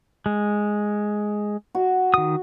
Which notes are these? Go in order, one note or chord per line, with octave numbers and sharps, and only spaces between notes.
G#3
F#4
D#3 D#6